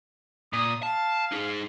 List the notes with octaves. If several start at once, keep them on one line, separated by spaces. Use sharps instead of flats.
A#2 D#6
F5 A5
D#4 G#4